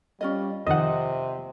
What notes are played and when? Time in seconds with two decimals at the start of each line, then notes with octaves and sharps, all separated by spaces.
0.21 G3 C#4 F4 D#5
0.67 F2 C3 D#3 F4 C5 D#5 F#5